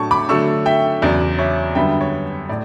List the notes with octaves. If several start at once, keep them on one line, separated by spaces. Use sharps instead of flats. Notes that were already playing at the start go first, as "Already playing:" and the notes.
Already playing: A2 F#3 A3 D4 A5 C#6
B5 D6
D3 F#3 A3 D4 C#6 E6
E5 G5
E2 C#3 F#3 D5
C#5 E5
F#2 D3 G3 B3 E5 G5
C#5
A2 D5